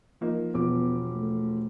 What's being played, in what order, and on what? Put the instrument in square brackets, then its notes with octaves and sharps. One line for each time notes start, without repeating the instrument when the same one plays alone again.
[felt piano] F3 A#3 D#4
[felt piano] E1 F3 D6 [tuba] B3
[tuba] A3